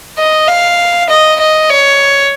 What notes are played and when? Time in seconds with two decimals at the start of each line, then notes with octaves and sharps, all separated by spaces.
0.18 D#5
0.48 F5
1.09 D#5
1.39 D#5
1.69 C#5